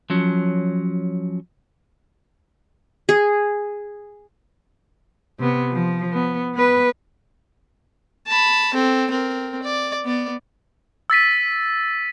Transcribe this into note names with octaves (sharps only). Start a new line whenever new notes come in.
F3 F#3 C#4
G#4
C3 B3
F3
B3
B3 B4
A5 B5
C4 A4
C4 A#4
D5
B3 D5
E6 A6 B6 D#7